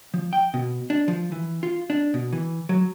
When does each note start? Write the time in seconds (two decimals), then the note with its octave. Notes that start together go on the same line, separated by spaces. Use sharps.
0.14 F3
0.33 G5
0.54 B2
0.90 D4
1.08 F3
1.32 E3
1.63 F4
1.90 D4
2.14 B2
2.33 E3
2.69 F#3